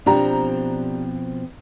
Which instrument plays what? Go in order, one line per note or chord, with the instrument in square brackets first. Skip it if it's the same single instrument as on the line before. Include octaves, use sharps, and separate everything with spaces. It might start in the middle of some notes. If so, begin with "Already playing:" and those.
[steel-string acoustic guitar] B2 F3 C4 [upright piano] D4 G4 A#5